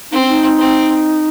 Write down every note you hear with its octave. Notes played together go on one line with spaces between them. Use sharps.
C4 D#4
C#4
D#4
C4